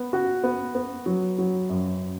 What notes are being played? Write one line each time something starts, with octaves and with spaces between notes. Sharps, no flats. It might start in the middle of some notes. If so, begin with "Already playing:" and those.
Already playing: B3
F#4
B3
B3
F#3
F#3
F#2